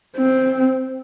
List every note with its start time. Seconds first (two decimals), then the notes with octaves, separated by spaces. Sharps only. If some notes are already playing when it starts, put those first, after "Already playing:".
0.17 C4